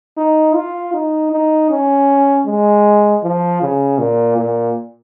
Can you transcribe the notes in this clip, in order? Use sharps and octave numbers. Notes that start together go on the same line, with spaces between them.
D#4
F4
D#4
D#4
C#4
G#3
F3
C#3
A#2
A#2